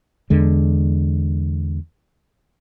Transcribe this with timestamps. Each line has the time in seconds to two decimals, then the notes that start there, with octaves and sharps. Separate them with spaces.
0.30 E2 D3 G#3